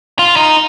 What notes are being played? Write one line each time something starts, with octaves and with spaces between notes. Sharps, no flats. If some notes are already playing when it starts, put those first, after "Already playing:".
F4
D#4